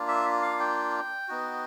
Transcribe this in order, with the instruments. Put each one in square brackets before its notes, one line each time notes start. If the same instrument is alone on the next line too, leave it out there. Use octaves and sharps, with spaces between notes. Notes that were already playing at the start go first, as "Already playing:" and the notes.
Already playing: [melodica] A#3 D4 F4
E5
F5
G5
B3 D#4 F#4